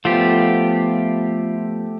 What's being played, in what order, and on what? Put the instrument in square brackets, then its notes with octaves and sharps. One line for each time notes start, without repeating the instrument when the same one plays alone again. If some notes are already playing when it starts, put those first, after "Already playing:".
[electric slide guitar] F3 B3 [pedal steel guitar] A3 G4 [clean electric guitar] F4